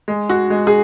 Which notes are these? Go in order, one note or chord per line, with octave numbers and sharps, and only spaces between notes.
G#3
F#4
G#3
G#4